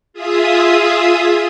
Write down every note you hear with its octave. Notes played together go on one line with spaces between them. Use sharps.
F4 G#4 E5 D#6